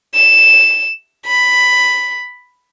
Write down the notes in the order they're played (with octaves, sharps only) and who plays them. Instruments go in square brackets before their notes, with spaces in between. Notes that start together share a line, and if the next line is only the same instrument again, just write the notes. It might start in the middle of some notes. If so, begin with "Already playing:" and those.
[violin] E7
B5